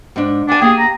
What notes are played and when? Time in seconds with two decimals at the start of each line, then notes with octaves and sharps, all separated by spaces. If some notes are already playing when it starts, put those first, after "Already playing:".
0.16 G#2 D4
0.48 D4 F#5 G#5
0.61 A#3 G4 G#4
0.79 A#5